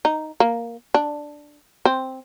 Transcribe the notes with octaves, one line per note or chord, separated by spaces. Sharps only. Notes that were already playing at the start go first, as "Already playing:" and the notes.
D#4
A#3
D4
C4